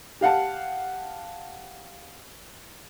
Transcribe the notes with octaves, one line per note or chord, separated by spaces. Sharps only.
G4 F5 F#5 A5